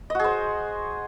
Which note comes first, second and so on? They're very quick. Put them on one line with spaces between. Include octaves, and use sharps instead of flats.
D#5 F#4 G#4 C5